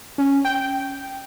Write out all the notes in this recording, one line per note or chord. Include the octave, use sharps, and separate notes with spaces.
C#4
G5